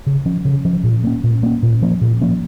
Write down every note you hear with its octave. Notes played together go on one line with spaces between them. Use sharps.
C#3
F3 C#4
C#3
F3 C#4
A#2
A#3 C#4
A#2
A#3 C#4
A#2
F3 A#3 C#4
A#2
F3 A#3 C#4